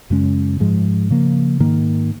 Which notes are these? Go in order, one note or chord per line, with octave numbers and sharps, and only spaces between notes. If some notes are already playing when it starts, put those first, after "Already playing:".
F#2 C#3 G#3 C#4
G#2 F3 G#3
C#3 F3 A#3
G#2 D#3 A#3